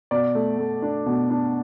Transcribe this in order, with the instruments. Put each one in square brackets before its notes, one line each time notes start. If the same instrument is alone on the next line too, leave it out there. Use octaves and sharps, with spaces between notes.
[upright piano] B2 D5
A3
A3
D4
B2
D4